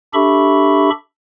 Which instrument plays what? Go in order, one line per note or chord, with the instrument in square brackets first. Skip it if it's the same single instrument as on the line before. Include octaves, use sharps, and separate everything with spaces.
[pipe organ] D4 G4 A4 E5 B5 C#6